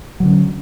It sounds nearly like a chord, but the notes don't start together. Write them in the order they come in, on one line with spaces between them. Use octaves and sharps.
F#3 D3 C#4